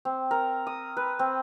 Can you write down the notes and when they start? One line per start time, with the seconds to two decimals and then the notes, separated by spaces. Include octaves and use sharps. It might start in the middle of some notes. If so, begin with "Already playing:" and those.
0.05 C4
0.31 A#4
0.67 D#6
0.97 B4
1.19 C4